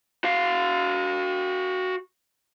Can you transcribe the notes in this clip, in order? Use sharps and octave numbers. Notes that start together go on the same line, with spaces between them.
F#4 F5